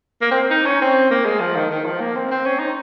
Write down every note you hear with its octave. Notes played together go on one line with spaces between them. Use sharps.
A#3
C4
D#4
C#4
C4
A#3
G#3
F3
D#3
D#3
F3
A#3
C4
C4
C#4
D#4